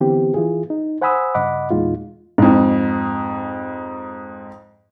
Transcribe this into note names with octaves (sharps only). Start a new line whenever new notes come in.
D3 E3 B3 C4 G4
E3 F4 G#4
D#4
C5 F#5 G#5 B5 D#6 E6
G2 C#3 D#5 F#5 B5 D6
E2 A#2 G#3 D#4 F4
F2 G#2